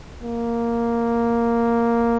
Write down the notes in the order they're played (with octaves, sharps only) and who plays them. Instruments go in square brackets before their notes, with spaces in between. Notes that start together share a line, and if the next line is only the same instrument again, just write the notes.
[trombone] A#3